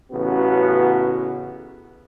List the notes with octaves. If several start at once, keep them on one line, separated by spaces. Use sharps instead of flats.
A1 C#3 B3 F#4